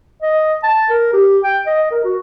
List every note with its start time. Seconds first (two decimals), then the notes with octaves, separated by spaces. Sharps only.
0.22 D#5
0.63 A5
0.90 A#4
1.13 G4
1.44 G5
1.66 D#5
1.91 A#4
2.04 F#4